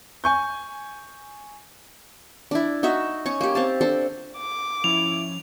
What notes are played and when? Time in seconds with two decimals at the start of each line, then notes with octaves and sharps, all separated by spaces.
0.24 G#5 C#6 G6
2.51 D4 E4
2.83 D#4 F#4 E5
3.26 C#4 C#6
3.41 A#3 G4
3.55 C4 F5 A5
3.81 D4 A4 C5
4.38 D6
4.84 F3 C#4 E4 C#5 F7